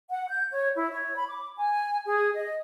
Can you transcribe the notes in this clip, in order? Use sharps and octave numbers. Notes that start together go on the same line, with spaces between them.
F#5
G6
C#5
E4
C#5
B5
D6
G#5
G#4
D#5